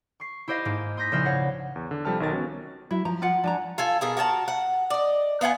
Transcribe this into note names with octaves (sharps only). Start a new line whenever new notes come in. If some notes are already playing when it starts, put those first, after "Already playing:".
C#6 C7
E4 G4 C5 D#5 F5
G#2 A#3
C6 D#6 G6 A#6 B6
A#1 C#3 C5 E5 F6
C#5 F5 F#5
E2
D3
C3 F3 G3 A4 A5 F6
B1 D#3 A#4 A6
B3 C#4 F#4
F#3 E4
F3 A#5
F4 F#5
F3 D4 G#5 A#5
F4 A4 G#5
B2 G#4 A#4
F#4 A#4 G#5 A5
F#5
D5 D#5
B3 F4 F#5 G#5